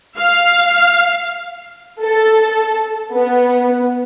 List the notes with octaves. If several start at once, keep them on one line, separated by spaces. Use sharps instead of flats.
F5
A4
B3